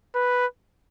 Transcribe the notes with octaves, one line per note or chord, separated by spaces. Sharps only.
B4